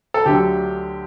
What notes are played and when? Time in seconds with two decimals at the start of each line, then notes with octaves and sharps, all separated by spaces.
0.14 A4
0.26 D2 D3 F#3 G4